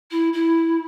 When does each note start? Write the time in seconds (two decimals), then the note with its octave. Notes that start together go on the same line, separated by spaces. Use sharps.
0.11 E4
0.33 E4